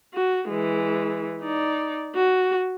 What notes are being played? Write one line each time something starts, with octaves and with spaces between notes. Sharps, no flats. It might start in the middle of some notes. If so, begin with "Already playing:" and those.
F#4
E3 G#3
D#4 D5
F#4